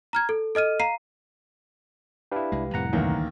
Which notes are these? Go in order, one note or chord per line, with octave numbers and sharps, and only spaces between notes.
A#5 F6 G#6
A4
A4 D#5 F6 D#7
F5 A#5 C7 D#7
D4 E4 G4 B4 F5
C2 G#3
C2 F2 A2 F#5 A#5
A1 D2 D#3 E3 A#3